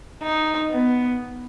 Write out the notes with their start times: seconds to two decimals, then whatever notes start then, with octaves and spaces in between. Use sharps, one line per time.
0.23 D#4
0.71 B3